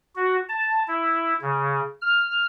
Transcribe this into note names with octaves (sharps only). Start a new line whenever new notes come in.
F#4
A5
E4
C#3
F6